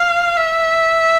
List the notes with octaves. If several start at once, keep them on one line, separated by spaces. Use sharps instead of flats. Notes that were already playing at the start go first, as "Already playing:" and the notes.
Already playing: F5
E5